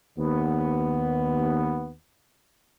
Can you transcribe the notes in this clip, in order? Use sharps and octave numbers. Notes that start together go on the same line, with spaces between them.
D#2 B3